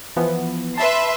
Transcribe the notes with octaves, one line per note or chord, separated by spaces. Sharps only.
E3 F3 B3
B4 E5 A5 C6 C7